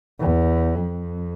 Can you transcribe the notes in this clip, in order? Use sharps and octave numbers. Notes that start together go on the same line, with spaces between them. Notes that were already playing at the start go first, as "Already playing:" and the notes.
E2
F2